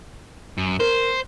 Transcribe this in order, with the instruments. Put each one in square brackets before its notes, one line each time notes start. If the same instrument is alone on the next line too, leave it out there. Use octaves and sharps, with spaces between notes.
[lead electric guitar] F#2
[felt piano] A#4 [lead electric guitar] C5